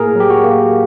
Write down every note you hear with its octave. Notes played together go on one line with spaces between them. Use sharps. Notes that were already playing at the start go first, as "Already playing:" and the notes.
Already playing: A2 A#3 G#4 A#4
F#3 G4
F#4
A#3